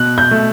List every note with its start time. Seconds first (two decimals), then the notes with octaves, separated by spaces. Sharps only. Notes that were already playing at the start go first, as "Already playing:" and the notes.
Already playing: B2 F#6
0.18 G6
0.31 A3